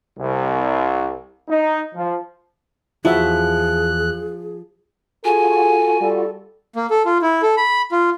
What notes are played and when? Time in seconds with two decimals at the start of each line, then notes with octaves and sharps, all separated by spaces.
0.18 C2
1.48 D#4
1.94 F3
3.05 E2 F3 E4 F#4 G#4 E5 F#6
5.25 F4 F#4 G#4 A4 G#5
6.01 G3 A4
6.76 A#3
6.90 A4
7.05 F4
7.22 E4
7.42 A4
7.57 B5
7.92 F4